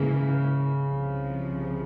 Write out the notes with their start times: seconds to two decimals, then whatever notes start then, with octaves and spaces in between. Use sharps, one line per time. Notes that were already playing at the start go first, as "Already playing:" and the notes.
Already playing: G#2 C#3 E3 A#3
0.82 C2 C3 F3